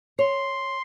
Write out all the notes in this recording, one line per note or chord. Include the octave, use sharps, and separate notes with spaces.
C#5 C6